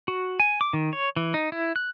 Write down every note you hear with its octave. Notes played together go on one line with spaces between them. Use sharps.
F#4
G#5
D6
D#3
C#5
E3
D#4
E4
F#6